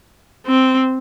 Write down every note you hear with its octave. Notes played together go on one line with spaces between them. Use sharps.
C4